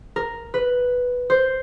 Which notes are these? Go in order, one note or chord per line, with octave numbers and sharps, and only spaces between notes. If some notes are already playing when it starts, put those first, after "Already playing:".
A#4
B4
C5